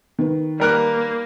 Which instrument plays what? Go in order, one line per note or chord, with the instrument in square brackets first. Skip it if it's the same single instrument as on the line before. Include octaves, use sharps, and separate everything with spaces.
[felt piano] D#3 B4
[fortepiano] G3 A#4 F#6 [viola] A#3